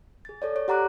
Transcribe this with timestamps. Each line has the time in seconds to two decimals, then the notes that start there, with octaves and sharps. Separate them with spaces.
0.25 G#4 A6
0.42 A4 C#5 D5
0.56 C#5
0.68 G4 F#5 A#5 D6 F#6